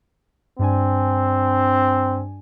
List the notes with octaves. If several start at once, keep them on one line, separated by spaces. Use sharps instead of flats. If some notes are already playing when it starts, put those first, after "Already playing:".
G2 C4 D4 G#5